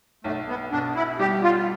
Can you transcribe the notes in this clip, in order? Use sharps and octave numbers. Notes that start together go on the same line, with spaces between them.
B1 A3
B3
B2 D4
E4
G3 G4
F4